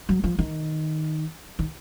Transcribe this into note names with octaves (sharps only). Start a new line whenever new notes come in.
F#3
F3
D#3
D#3